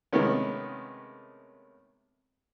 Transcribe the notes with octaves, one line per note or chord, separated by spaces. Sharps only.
C3 D#3 G#3 A3 B3 C#4